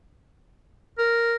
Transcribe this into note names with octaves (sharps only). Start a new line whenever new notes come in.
A#4